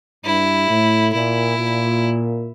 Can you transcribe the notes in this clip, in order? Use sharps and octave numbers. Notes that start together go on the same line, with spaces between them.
G2 E4
A2
A#2 E4
A#2